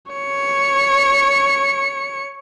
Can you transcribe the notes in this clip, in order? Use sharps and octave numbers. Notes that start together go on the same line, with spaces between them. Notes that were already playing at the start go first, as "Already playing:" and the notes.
C#5 C#7